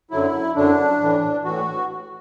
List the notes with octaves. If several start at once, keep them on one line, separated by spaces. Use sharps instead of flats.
F#2 D3 F#3 E4
F#2 D3 F#3 D4
A2 E3
A2 E3 F#4